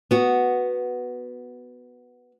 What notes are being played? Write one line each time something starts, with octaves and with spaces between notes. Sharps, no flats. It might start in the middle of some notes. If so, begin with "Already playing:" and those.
B3 F#4